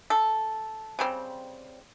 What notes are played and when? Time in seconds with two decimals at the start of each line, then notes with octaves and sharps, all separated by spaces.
0.10 A4
0.99 C#3 G3 C4